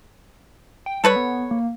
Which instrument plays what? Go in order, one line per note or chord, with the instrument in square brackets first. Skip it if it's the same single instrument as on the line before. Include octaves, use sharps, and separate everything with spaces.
[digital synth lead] G5
[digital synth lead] G3 [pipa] A4 B4 C#5
[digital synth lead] B3
A#3